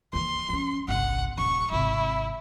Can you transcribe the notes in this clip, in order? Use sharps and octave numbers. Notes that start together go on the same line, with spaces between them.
D#2 E3 C6
F3 C#4
G1 C2 F#5
D#1 G3 C#6
G#1 C3 E4